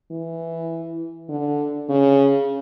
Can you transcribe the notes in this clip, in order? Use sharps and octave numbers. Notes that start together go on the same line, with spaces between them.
E3
D3
C#3